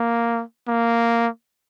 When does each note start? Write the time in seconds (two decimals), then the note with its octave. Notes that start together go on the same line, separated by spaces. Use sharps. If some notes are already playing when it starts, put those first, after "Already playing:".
Already playing: A#3
0.68 A#3